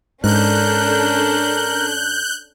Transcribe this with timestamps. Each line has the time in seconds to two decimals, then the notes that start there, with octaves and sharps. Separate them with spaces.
0.24 G#2 C#4 D4 A4 A#4 F#6 G6